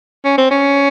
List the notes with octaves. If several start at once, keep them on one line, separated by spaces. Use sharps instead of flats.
C#4
C4
C#4